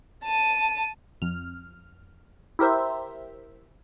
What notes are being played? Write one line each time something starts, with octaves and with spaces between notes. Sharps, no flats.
A5 D#7
F2 F6
E4 G4 A#4 C5 E5